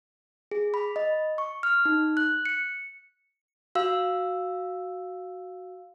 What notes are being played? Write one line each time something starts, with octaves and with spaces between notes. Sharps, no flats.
G#4
B5
D#5
C#6
F6
D#4
F#6
C#7
F#4 F5 E6